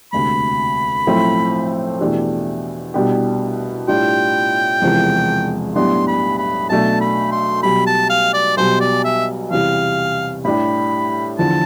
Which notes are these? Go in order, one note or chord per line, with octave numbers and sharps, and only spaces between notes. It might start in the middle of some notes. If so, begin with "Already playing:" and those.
E1 D2 C3 B5
B1 A2 F3 A3 C4
E2 B2 A3 D4 G4
C2 B2 B3 D4 G4
A2 G3 D4 F4 G5
E1 E2 C3 F3
B1 A2 G3 B3 D4 C6
B5
B5
B1 B2 A3 D4 A5
B5
C6
B1 B2 G3 B5
A5
F5
D5
B1 B2 G3 C5
D5
E5
E2 C3 G3 F5
A2 G3 D4 G4 B5
E2 D3 F3 A5